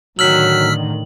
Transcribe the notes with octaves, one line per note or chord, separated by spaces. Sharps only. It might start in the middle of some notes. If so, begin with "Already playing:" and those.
A2 D3 D#3 F#3 E6 F6 B6 F#7